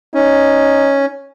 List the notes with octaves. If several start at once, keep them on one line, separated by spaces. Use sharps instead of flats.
C#4 D#4